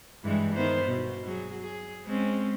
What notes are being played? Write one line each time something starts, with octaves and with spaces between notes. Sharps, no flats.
G2 E3 G#3
D#3 B3 C5
B2
F#3 G#4
G#4
G#3 C4 C#4